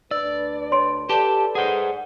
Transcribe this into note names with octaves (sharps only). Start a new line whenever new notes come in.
D2 D4 B4 D5 E6
C#5 C6 D7
G4 A4 B4 D5 A5
G#4 C5 F#5